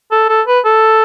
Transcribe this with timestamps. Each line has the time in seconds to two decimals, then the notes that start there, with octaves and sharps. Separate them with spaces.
0.12 A4
0.29 A4
0.47 B4
0.65 A4